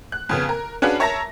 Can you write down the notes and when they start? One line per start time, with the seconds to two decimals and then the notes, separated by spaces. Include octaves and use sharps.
0.12 F#6
0.29 F2 C#3 B3
0.49 A#4
0.82 C#4 D4 F#4 G#4 B4 F5
0.99 A#4 C#5 E5 A5 A#5 A#6